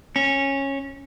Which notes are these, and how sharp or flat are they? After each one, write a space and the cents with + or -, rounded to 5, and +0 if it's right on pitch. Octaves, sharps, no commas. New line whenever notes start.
C#4 -15